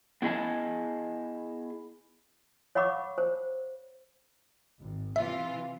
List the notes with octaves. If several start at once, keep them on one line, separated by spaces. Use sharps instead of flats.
B3 E4 G#4 D#5 G#5 A5
C#5 F5 F#5 B5 C#6 D6
C5
G#1
C3 E3 F4 E5